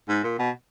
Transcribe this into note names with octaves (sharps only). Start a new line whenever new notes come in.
G#2
A#2
B2